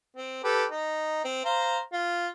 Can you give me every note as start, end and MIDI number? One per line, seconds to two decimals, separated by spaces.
0.16 0.40 60
0.44 0.65 67
0.44 0.65 69
0.44 0.65 71
0.71 1.24 63
1.24 1.43 60
1.45 1.80 72
1.45 1.80 77
1.45 1.80 82
1.93 2.28 65